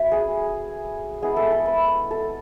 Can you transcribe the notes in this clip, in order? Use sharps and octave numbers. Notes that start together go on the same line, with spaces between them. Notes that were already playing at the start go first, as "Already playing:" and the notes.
Already playing: F#3 A3 C#4 B4 E5
G#4
G#3 B3 E4 G#4
A4
A4
B4
A4